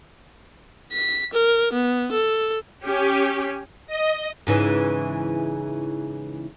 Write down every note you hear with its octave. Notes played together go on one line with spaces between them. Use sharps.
B6
A#4
B3
A4
C#4 G4
D#5
G#2 C#3 E3